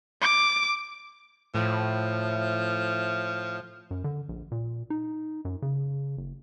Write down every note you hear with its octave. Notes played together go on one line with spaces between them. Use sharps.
D6
A2 F3
F#2
D3
A#1
A#2
D#4
F#2
C#3
F#1